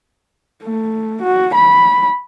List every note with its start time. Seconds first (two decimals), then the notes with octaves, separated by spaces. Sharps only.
0.64 A3
1.23 F#4
1.55 B5